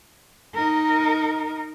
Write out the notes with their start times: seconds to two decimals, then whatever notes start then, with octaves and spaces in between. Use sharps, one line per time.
0.54 D#4 A#4